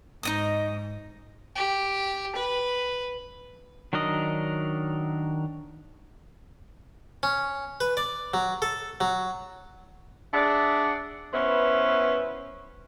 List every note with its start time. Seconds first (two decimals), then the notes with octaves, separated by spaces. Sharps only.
0.23 G#2 D#4 D#5 D#6
1.56 G4
2.36 B4
3.93 D#3 F#3 D4 A#4 D#5
7.23 C#4
7.81 B4
7.97 D5
8.34 F#3
8.62 A4
9.01 F#3
10.34 D4 G#4 D5 E5 F#5
11.33 B3 C#4 E4 B4 C5